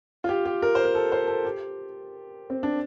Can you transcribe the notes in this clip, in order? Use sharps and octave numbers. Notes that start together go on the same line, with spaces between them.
F4
G4
G4
A#4
C5
A#4
A4
C5
A4
G4
C4
D4